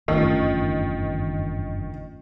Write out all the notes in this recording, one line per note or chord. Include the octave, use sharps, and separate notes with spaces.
F#1 E2 G2 D#3 A3 C#4 F4